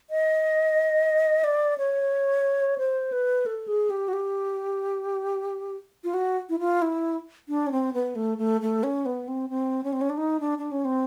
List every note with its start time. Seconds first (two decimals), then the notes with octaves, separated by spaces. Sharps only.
0.10 D#5
1.44 D5
1.78 C#5
2.78 C5
3.12 B4
3.46 A4
3.68 G#4
3.90 G4
4.08 F#4
4.13 G4
6.04 F4
6.14 F#4
6.49 E4
6.59 F4
6.82 E4
7.49 D4
7.67 C#4
7.72 C4
7.94 B3
8.15 A3
8.38 A3
8.61 A3
8.83 C#4
9.06 B3
9.28 C4
9.50 C4
9.84 C#4
9.93 C4
10.01 C#4
10.10 D4
10.18 D#4
10.40 D4
10.58 D4
10.71 C#4
10.85 C4